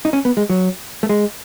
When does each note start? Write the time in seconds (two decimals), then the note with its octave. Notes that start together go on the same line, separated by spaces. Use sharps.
0.05 D#4
0.13 C#4
0.25 B3
0.37 G#3
0.49 F#3
1.03 A3
1.09 G#3